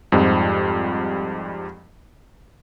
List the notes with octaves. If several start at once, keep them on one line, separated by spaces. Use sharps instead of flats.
F2 G#2 F3 G3